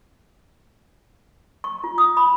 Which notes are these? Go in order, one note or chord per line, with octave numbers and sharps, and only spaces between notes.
C#6
F4
D#6
B5